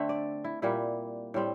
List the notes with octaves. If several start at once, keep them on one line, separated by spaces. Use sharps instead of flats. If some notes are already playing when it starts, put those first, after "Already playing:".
Already playing: D3 A3 C4 E5
D5
E4
A#2 G3 A#3 E4
A2 G3 C4